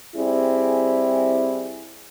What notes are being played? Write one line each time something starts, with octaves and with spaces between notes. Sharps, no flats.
G3 C4 E4 G#4